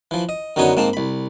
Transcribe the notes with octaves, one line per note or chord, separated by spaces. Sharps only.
E3 F3
D#5
F#2 D3 F#3 B3 D#4 C#5
G#2 A#3 C4 A5
C2 B5